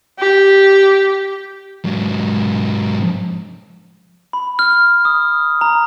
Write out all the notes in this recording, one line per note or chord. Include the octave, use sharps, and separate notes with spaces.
G4
G#2 F#3
B5
F6
D#6
A#5